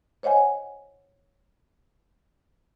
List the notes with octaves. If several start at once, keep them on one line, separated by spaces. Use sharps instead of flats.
C5 C#5 D#5 F#5 G#5